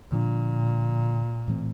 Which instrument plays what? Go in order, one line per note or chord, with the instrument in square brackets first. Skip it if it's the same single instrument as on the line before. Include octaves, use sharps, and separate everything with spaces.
[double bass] A#2 [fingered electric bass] D3 F3 A#3 D4
[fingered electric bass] A2 E3 A3 C4